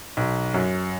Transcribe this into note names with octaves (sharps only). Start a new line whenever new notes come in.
B1
F#2